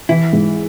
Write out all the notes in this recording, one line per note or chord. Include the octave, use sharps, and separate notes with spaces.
E3 E4
G#2